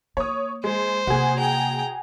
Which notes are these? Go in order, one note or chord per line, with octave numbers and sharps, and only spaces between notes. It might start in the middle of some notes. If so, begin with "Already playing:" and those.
A#3 C#5 D#6
G#3 C5
C3 A#3 F#4 G#4
G5 A#5